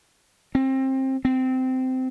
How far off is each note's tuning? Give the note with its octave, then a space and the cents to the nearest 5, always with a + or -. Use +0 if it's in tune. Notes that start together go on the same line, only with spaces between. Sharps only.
C4 +25
C4 -20